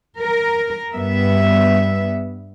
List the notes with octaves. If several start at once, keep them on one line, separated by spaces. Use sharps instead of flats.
A#4
G2 B3 E5